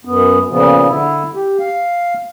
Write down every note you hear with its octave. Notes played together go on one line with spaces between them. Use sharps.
F#2 B3
A#2 C#3 F3 B3
D3 E4
G4
F5